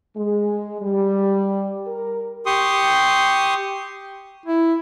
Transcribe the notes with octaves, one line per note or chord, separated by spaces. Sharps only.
G#3
G3
A#4
G4 C6 C#6 D#6
E4